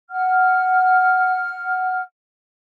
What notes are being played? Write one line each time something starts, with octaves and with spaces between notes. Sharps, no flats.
F#5 F6